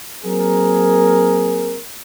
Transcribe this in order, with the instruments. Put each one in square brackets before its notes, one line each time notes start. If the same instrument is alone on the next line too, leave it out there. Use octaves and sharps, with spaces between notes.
[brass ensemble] F#3 A#3 C4 G#4 A#4